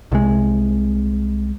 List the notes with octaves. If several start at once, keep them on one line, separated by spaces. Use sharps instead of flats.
C2 C3 G#3